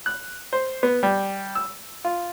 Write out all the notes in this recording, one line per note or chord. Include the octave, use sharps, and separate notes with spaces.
F#6
C5
B3
G3
E6
F4